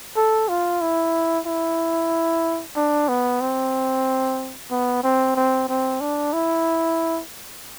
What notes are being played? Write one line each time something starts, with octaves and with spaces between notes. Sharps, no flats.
A4
F4
E4
E4
D4
B3
C4
B3
C4
C4
C4
D4
E4